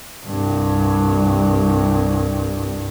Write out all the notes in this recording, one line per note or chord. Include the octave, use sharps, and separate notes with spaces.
C2 G2